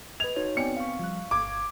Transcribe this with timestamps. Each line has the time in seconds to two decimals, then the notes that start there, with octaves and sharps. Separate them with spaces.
0.20 B4 D#5 G#6 F7
0.36 D#4 F#4 C#5
0.57 B3 C4 D5 G5 G#5 C#7
0.77 F5 C#6
0.99 F3 G3 F#6
1.31 G1 D6 G#6